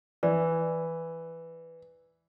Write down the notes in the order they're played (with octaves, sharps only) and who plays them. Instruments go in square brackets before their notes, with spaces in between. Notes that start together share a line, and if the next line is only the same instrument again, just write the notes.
[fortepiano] E3 [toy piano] D5